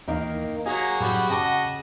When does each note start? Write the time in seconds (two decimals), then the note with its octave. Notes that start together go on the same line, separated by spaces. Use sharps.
0.08 D#2 D#3 E3 A#3 D#4
0.66 F#3 A#3 F#4 G#4
1.00 F#2 A2 F#3 G3 B3 F#4
1.29 C#3 F#4 D#5 G5 A5 D6